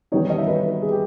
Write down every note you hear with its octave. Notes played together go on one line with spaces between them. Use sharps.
D#3 G3 B3 D#4 C#5
D#5
E5
B4
G#4
G4